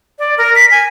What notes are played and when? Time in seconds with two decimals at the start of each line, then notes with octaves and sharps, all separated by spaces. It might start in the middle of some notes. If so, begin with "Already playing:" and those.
0.19 D5
0.38 A#4
0.55 B6
0.71 G#5